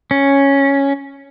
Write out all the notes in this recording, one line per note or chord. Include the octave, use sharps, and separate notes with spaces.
C#4